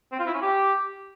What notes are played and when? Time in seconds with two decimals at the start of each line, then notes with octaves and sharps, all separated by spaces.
0.12 C4
0.19 F4
0.27 E4
0.34 C#4
0.41 G4